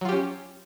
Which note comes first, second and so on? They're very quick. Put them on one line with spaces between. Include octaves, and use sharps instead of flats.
F#3 F4 G4 C#4